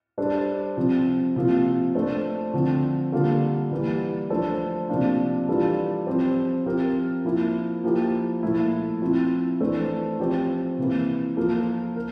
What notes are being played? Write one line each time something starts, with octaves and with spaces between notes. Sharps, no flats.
G3 D4 A4 C5
C3 F3 C4
C3 F3 A#3 F4
A3 D4 A4 C5
D3 F3 C4
D3 G3 A#3 F4 A4
E3 G3 A#3
F3 A3 D4 A4 C5
C3 F3 A#3 D4 F4
E3 G3 D4 F4 A4
F3 C4 G4 C5
F3 C4 G4 A#4
F3 A#3 E4 A#4
F3 A#3 E4 G4
A#2 F3 A3 E4
F3 C4 E4
E3 A3 D4 A4 C5
F3 C4 G4 C5
C3 E3 A#3 E4
F3 A#3 F4 A4
A#4